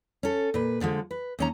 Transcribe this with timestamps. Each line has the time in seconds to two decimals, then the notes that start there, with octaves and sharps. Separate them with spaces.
0.23 C#4 A4
0.54 A#2 B4
0.81 D3 F3 G#3
1.11 B4
1.39 D#2 C#4 A#5